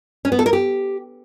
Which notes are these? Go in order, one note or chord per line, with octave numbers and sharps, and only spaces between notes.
C#4
B3
A4
A#4
G4